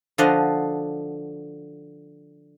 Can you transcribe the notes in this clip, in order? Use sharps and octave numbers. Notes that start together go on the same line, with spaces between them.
D3 F3 D4 F#4 D#5 F5